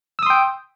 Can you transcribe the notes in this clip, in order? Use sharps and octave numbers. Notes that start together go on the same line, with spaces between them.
G5 C6 D#6 E6